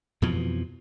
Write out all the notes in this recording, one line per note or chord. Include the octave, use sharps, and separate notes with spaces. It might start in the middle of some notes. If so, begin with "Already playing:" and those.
F2 B2 E3 F3